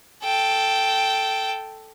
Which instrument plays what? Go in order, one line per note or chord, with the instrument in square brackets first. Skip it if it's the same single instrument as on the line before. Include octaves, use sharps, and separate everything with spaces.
[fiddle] A4 G5